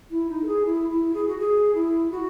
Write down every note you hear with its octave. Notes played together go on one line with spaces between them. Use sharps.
E4
D#4
A4
G#4
E4
E4
G#4
F#4
G#4
E4
F#4